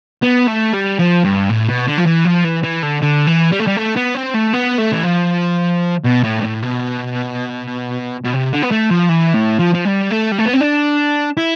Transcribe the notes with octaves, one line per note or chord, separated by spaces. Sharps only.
B3
A3
G3
F3
G2
A2
B2
D3
F3
E3
F3
E3
E3
D3
D3
E3
G3
A3
G3
A3
B3
C4
A3
B3
A3
E3
F3
B2
A2
G2
A2
B2
B2
C3
D3
B3
A3
F3
E3
A2
F3
F3
G3
A3
G3
A3
B3
C4
D4
E4